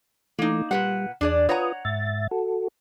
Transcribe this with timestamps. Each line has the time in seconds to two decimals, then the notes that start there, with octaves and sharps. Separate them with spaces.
0.39 E3 A3 A#3 D#4
0.71 A#2 G3 B4 F#5
1.21 E2 D4 G#4 D5
1.49 F4 B4 C#5 F#5 A#5 D#6
1.85 G#2 E5 A6
2.31 F#4 A4